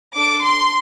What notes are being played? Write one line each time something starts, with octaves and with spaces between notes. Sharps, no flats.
D4 A4 D6
C6